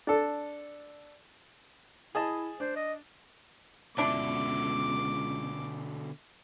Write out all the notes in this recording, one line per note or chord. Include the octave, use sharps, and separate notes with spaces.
D4 A4
E4 G#4 D#5 A5
D4 C5
D#5
C#2 B2 D3 D4 E4 D6